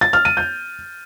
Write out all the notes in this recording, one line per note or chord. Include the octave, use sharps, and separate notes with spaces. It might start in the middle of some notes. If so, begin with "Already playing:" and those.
A6
F6
D#7
G6